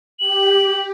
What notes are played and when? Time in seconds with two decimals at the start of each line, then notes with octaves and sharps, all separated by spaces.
0.20 G4 F#7